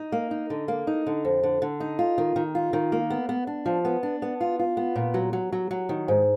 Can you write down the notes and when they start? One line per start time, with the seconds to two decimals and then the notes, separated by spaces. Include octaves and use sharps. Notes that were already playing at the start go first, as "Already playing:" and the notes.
Already playing: D#4
0.12 A#3
0.31 D#4
0.50 D3
0.68 A#3
0.87 D#4
1.06 D3
1.25 F2
1.43 D3
1.62 D3
1.80 D#4
1.99 F4
2.18 D#3
2.36 D#3
2.55 F4
2.73 D#3
2.92 A#3
3.10 B3
3.29 B3
3.47 D4
3.66 F3
3.85 B3
4.03 D4
4.22 B3
4.41 F4
4.59 F4
4.77 B3
4.96 A#2
5.14 F#3
5.33 F#3
5.52 F#3
5.71 F#3
5.89 D#3
6.08 G#2